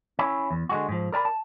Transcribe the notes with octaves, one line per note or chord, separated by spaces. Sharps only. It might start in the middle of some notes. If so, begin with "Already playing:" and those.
C#4 E4
E2
D3 G#3 F#4
G#2 F3
A#4 D5 A5 B5
A5